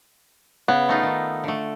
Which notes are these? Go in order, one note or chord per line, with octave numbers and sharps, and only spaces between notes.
C#3 B3
A3 D#4 F4
D#3
D3 A3